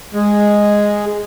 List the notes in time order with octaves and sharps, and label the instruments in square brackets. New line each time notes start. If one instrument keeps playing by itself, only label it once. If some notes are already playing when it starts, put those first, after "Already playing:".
[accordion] G#3